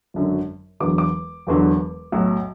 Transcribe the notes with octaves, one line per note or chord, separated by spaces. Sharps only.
G#1 F#2 D3 F#3
E1 E2 D3 F#3 D6
D6
E1 E2 D3 F#3
B1 A2 F#3